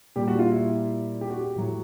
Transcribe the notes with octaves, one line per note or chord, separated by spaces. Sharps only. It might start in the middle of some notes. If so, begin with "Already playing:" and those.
A#2 G3 G4
F#4
F4
E4
G4
F#4
G4
A2 F#3